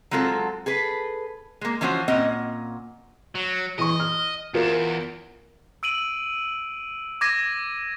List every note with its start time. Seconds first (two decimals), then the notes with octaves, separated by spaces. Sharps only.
0.11 F#3 G#3 C4 F4 A4
0.66 G#4 A4 B4
1.61 G#3 A#3
1.81 E3 F3 C#4 F4 F#4 C5
2.08 A#2 C4 C#4 D#5 F#5
3.35 F#3
3.79 E3 D#5 C#6
4.00 F6
4.54 E2 F4 A#4 E7
5.83 E6 D7 D#7 F#7
7.21 D6 G#6 A#6 D#7